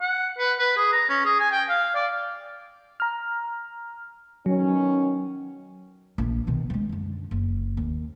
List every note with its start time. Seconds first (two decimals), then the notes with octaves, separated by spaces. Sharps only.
0.01 F#5
0.38 B4
0.59 B4
0.77 G#4
0.92 A#5
1.09 C#4
1.25 G#4
1.40 G#5
1.52 G5
1.69 F5
1.95 D5
3.00 A#5 F6
4.46 B2 D#3 F#3 C#4
6.18 A#1 E3
6.47 B2 D#3
6.70 F3 G#3
6.89 F#2 D3
7.31 F#1
7.77 D#2